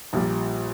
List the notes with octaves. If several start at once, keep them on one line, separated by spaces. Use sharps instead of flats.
A#1 A#2 G3